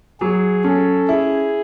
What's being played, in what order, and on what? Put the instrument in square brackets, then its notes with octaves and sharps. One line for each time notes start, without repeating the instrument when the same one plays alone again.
[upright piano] F#3 [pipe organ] G#4
[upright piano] C#4 [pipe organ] A4
[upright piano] E4 [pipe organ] G#4